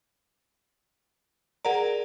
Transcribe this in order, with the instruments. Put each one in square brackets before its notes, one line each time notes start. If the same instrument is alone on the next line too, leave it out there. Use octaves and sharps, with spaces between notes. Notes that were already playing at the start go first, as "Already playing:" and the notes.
[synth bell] G#4 A#4 D5 [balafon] F#5 A#5